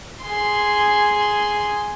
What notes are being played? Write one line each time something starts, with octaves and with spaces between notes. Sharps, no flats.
G#4 C6